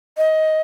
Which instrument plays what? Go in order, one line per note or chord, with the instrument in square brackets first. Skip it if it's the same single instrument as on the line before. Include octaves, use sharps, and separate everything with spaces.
[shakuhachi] D#5